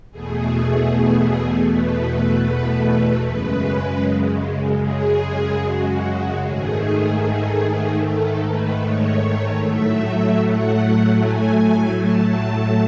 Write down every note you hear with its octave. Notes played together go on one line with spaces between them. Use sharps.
E2 B2 A3 G#4
B4
F#2 C#3 G#3 B4
G#4
F#4
G#2 D#3 A3 G#4
A4
B4
C#5
A2 F#3 A3 E5
F#5
G#5
A5